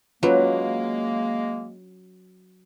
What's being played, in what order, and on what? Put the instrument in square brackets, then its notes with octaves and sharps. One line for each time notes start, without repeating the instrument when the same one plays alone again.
[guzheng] F#3 [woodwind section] G#3 A#3 [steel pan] C#4 F4 B4